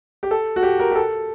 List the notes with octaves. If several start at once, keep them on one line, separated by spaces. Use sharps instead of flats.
G4
A4
F#4
G4
A#4
G4
A4